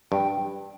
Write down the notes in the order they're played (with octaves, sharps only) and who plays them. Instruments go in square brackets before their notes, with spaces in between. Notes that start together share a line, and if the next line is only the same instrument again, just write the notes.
[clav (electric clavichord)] G2 [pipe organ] G5